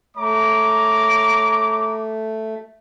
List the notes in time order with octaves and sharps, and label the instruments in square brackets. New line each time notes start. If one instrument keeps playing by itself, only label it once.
[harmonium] A3 [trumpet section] C#5 A#5 D6